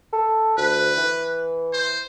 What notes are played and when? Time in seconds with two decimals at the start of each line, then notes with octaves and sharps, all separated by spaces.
0.13 A4
0.58 D2 B4
0.97 E3
1.73 C5